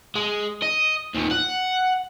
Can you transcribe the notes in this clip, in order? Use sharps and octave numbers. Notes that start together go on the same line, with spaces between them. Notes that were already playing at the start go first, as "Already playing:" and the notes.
G#3
D#5
D#2 A#2
F#5